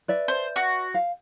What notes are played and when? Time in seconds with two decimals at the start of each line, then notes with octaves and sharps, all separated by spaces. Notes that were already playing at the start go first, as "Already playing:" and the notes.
0.08 B4 D5 E5
0.28 C5
0.56 F#4
0.94 F5